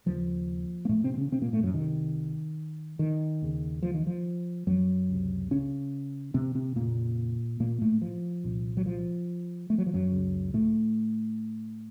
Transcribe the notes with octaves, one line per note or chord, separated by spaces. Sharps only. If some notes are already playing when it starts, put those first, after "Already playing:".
D#2 C#3 F3
A#3
A2 A3
C3 C4
C4
C#3 C#4
C3 C4
A#2 A#3
A2 A3
F#2 F#3
C2 C3 D#3
D#3
D#2 C#3
F3
D#3
F3
F#2 F#3
C#2 C3
C#3 C#4
C3 C4
C3 C4
F2 A#2 C#3 A#3
A#2 A#3
A2 A3
F3
C2 A#2
F#3
F3
A3
F#3
F3
F#2 F#3
C#2 C#3
A2 A3